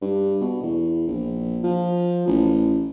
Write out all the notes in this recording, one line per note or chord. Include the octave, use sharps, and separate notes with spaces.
G2
B2
E2
A#1
F3
A1